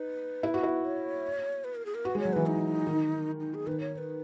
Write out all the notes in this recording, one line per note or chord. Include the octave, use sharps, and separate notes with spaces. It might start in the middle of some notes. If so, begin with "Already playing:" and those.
Already playing: D#4 B4
E4
F#4
E4
C#5
B4
A#4
G#4
A#4
F#4 B4
G#3
C#5
F#3
E3 B4
D#4
D#3
D#4
G#4
D#3 B4
C#5
C#5
B4